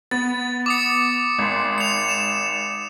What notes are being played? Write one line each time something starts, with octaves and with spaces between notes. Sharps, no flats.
B3 A6
D6 D#6 C#7
G#1 C6
C#7 F7
E7